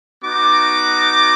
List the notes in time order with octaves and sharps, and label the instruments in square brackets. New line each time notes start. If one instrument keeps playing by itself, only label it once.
[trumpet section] B3 D#4 F#4 D6